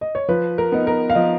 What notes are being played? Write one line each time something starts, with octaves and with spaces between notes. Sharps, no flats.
D#5
C#5
F3 B4
A#4
B3 D#4
A#4
F5
F3 D#5